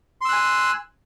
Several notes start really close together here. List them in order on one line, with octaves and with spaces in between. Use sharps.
C6 E6 F#6 G#5